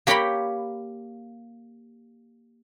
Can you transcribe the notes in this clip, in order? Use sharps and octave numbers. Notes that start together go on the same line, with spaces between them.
A#3 G4 C#5 G5 A#5 B5